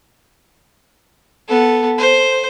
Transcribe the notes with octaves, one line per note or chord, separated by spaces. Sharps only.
B3 A4
C5